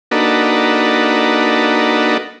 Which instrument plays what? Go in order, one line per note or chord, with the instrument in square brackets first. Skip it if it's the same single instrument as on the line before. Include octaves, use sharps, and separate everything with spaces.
[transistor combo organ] A#3 D4 D#4 F#4 A4 B4